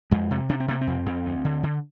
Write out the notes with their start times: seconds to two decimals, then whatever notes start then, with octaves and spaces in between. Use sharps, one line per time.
0.11 F2 G#3
0.31 C3
0.49 C3 D4
0.60 C4
0.68 C3 A#3
0.81 C4
0.87 F2
1.06 F2
1.26 D2
1.45 D3
1.63 D3